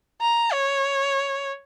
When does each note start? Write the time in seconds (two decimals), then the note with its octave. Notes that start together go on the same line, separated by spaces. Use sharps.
0.21 A#5
0.52 C#5